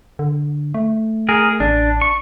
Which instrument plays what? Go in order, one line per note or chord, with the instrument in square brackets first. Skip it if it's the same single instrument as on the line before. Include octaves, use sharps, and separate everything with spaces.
[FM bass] D3
A3
[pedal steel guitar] G#4 A#4
[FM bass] A1 [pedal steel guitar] D4
[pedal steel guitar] C#6